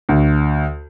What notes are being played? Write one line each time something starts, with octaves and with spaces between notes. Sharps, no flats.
D2